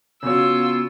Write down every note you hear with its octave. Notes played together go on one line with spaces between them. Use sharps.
C#3 B3 F4 F#4 C#5 E6